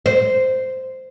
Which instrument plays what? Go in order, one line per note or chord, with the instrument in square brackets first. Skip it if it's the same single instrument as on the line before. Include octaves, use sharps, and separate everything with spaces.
[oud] C5